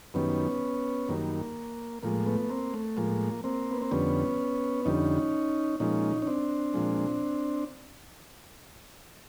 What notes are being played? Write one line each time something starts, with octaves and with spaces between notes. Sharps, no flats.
F#2 D#3 G3 B3 C#4
F#2 D#3 G3 A#3
A2 F3 G#3 A#3
A3 B3
A#3 C4
A3
A2 F3 G#3 A#3
A#3 C4
B3
C4
F2 D3 G3 B3 C#4
F2 D3 G3 C#4 D#4
A#2 F3 G#3 C#4 D#4
C#4
C4 D4
A#2 F3 G#3